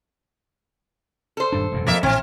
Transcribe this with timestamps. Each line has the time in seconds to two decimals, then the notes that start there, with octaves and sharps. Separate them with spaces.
1.37 A4 C5
1.52 D#1 G2 D4
1.72 E1 F#2 A#2
1.87 F2 A#3 E5
2.03 A#1 A2 E3 C4